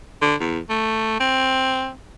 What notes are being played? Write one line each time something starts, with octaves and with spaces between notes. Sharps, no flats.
D3
E2
A3
C4